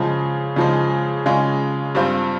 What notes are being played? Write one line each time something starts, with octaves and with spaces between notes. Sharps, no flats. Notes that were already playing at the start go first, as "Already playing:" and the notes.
Already playing: C#3 F3 G#3
C#3 F3 G#3
C#3 G#3 C#4 F4
G2 G3 C4 F4